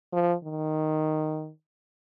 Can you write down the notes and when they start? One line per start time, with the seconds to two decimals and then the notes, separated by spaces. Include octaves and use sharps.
0.13 F3
0.44 D#3